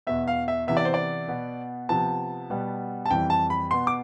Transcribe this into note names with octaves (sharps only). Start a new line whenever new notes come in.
E2 B2 B3 E5
F5
E5
C3 E3 B3 E5
D5
C5
D5
B2 B3
C3 F3 B3 A5
B2 G3 B3
A5
F2 E3 G3 G5
A5
B5
B2 B3 C6
D6